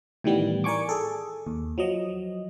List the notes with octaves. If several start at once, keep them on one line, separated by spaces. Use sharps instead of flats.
A2 D#3 E3 G3 B3
A#4 D5 G#5 C#6 D6
G#4 A4
D#2
F3 F#3 D#5